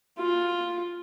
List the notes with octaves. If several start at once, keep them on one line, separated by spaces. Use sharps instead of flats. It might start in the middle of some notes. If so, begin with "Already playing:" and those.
F4